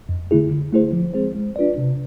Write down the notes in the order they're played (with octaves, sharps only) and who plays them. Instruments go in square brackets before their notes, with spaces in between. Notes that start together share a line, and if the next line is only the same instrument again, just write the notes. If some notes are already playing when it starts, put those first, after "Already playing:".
[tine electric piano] F2
D3 A3 E4 G#4
D3
A3 E4 G#4 C5
F3
G#3 C4 G#4 C5
G#3
D4 F4 B4 D5
C3